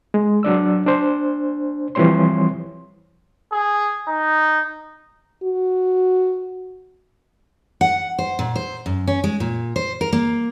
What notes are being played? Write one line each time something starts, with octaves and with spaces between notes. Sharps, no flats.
G#3
F#3 D4 D5 E6
D4 C5
E3 F3 G3 C4 C#5 C6
G#4
D#4
F#4
F#5
C5
A#2
C5
F#2
C#4
G#3
A#2
C5
A#4
A#3